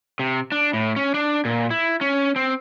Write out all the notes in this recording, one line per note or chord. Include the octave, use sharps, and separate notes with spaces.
C3
D4
A2
C#4
D4
A#2
E4
C#4
C4